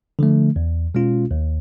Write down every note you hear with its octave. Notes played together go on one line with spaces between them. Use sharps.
D3 F3 A3
E2
B2 G#3 C#4 F4
D#2